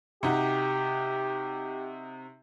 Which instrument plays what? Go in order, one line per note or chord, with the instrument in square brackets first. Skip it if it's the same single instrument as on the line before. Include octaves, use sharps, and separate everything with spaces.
[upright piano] C3 D#4 F#4 [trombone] G4